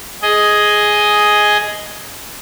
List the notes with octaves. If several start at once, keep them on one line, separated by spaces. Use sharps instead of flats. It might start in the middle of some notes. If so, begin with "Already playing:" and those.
G#4 D#5